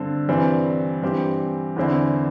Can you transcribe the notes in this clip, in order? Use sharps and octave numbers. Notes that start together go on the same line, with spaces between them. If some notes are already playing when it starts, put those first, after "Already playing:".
Already playing: G2 D3 C4 A4
G2 E3 G3 C4
G2 E3 C4 G4
E2 D3 C4 E4